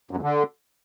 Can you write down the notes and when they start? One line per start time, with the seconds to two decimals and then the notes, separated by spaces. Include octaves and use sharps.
0.11 F#2
0.17 E2
0.22 D3